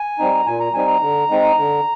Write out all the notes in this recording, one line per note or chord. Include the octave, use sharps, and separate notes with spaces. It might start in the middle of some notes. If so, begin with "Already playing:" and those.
Already playing: G#5
G3 C4 D#4
A#5
A#2 G#5
A#5
G3 C4 D#4 G#5
A#5
D3
G#3 C4 D#4
D3